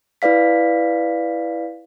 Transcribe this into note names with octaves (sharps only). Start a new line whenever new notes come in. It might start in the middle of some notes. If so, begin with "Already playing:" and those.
E4 B4 D5 F5 B6